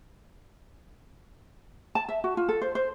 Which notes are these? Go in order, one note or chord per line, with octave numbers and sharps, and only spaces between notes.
A5
E5
F#4
F4
A4
C5
C5